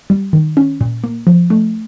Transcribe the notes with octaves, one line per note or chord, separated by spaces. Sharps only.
G3
D#3
C#4
A#2
A#3
F3
A3